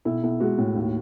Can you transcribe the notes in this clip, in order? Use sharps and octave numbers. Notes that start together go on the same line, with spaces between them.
B1 E4
B1 E4
G#3 F#4
A2
D#2